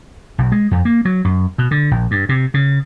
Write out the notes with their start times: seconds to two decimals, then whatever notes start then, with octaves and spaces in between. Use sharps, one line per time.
0.38 B1
0.52 G#3
0.71 F2
0.85 A#3
1.05 F#3
1.25 F#2
1.58 B2
1.71 D3
1.91 A#1
2.11 G2
2.29 C3
2.54 C#3